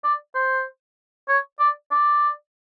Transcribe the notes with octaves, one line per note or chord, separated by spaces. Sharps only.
D5
C5
C#5
D5
D5